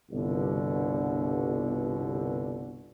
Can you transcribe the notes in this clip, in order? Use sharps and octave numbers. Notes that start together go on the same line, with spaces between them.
G1 C2 B2 D3